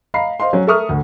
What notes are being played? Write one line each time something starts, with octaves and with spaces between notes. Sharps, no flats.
D#5 F5 A#5 B5 C7
C5 D#5 F5 C6
F#3 C#4
A4 A#4 E5 C#6 D#6 F6
D2